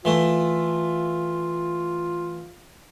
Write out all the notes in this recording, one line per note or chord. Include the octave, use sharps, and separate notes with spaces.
E3 A3 F4